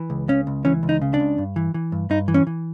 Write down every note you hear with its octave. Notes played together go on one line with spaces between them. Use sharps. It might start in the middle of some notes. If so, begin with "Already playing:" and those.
Already playing: E3
C#2
C#3 C#4
C#2
E3 C#4
C#2
D#4
C#3
D4
C#2
G2
E3
E3
G2
G2 D#4
E3
C#4
E3